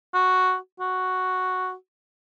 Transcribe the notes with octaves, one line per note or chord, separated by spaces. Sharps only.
F#4
F#4